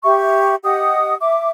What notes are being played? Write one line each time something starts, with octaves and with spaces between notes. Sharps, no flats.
G4 E5 C#6
G4 D#5 F#5 D#6
E5 D6